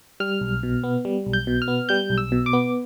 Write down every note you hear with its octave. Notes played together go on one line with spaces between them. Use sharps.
G3 F6
B1
B2
B3
G3
B1
G6
B2
F6
B3
G3 G6
B1
E6
B2
D6
B3